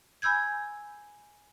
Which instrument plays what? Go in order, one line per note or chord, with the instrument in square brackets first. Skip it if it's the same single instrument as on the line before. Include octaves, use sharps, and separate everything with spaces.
[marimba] G#5 B5 E6 G6 G#6